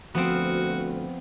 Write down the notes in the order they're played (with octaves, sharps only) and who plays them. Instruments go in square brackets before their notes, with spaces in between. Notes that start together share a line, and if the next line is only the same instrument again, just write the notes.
[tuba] D2 [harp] F3 F6 [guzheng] B3 C4 [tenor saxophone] F#4